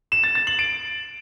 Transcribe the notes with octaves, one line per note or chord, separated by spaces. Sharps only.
E7
A6
A6
F#7
D7